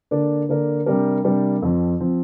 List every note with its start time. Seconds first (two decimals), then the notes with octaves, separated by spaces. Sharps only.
0.11 D3 A#3 D4 A#4 D5
0.49 D3 A#3 D4 A#4 D5
0.86 C3 G3 D4 G4 A#4
1.24 C3 G3 D4 G4 A#4
1.62 F2 F3 C4
2.00 F3 C4